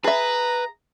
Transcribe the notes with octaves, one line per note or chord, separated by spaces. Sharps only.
G#4 B4 E5 A#5